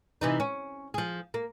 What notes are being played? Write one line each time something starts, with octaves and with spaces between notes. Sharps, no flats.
C3 E3 D#4
C#4
F3 G#4
A#3